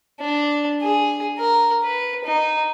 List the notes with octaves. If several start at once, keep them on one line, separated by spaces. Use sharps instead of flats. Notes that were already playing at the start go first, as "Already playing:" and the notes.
D4
G#4
A#4
B4
D#4